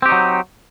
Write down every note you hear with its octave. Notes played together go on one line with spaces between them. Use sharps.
F#3 C4 D#4 G4